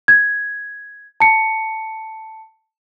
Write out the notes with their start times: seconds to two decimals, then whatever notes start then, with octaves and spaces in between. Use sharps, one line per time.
0.08 G#6
1.20 A5 C#7